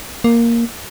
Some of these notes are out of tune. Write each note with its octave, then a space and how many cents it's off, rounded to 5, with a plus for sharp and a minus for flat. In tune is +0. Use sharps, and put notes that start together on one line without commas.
A#3 +0